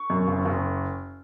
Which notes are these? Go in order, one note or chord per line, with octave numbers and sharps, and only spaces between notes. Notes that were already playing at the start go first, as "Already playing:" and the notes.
Already playing: C#6
F#2
F#1
F#1